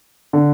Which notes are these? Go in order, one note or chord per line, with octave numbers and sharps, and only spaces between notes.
D3